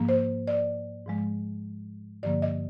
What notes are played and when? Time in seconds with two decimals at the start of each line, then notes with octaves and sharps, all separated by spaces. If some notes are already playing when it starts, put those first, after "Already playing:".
Already playing: G#2 F3 A#3
0.09 C5
0.48 D5
1.06 G#2 F3 G#3
2.23 G2 D3 F3 A#3 D5
2.42 D#5